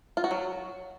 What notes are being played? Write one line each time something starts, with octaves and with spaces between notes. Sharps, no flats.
F4
F#4
F#3